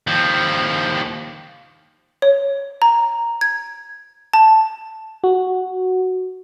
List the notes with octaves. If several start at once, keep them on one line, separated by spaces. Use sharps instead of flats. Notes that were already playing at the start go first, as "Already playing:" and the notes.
D#2 F3
C#5
A#5
G#6
A5
F#4